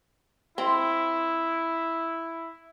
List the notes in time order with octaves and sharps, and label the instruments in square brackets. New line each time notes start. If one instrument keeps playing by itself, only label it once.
[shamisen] C4 [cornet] E4